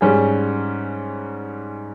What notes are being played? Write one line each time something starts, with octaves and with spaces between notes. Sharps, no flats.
G#2 G3 C#4 G#4